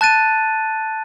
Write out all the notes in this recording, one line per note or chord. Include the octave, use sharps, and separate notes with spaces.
A5 F#6 A6 D#7